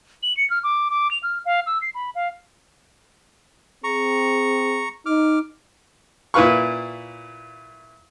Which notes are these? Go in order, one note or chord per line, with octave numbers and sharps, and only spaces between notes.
F#7
C#7
F6
D6
D6
F7
F6
F5
E6
C7
B5
F5
C4 G#4 A#5 C#6
D#4 D6 F6
A#2 E4 B4 F5 C#6